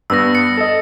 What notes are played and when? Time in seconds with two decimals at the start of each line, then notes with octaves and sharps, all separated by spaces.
0.10 G2 B3 E6 A#6
0.35 C#7
0.58 A4 D#5